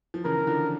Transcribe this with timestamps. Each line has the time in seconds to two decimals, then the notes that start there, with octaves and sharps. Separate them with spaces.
0.14 F3
0.25 C#3 E3 A#4
0.37 E3
0.47 D3 F3